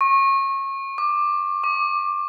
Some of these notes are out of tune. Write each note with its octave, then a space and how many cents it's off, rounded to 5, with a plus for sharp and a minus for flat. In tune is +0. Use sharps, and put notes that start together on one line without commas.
C#6 -30
D6 +15
D6 +0